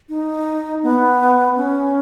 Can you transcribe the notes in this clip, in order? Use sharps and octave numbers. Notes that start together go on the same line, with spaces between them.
D#4
B3
C#4